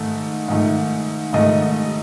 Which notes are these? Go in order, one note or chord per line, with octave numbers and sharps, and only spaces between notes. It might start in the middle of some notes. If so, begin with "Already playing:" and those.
Already playing: G#2 D#3 A3
G#2 D#3 A3
G#2 D#3 A3 D#5